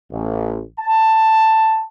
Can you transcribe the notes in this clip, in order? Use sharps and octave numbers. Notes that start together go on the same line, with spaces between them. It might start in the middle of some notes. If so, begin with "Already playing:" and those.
A1
A5